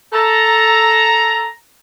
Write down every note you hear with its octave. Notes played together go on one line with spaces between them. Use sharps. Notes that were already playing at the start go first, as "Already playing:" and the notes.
A4 A#5